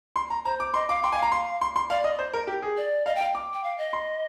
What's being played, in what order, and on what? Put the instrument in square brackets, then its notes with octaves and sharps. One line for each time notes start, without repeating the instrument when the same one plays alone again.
[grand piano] C6
A#5
[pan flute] C5 [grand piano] A#5
[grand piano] D6
[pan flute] D#5 [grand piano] C6
[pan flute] F5 [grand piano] D6
[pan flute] G5 [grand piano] C6
[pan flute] D#5 [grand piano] G#5
[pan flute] F5
[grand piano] A#5
C6
C6
C6
[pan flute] D5 [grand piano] F5
[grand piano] D#5
C5
A#4
G4
G#4
[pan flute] D5
[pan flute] D#5 [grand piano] F5
[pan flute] G5
[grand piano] F5
D6
[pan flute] G5
F5
D#5
[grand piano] C6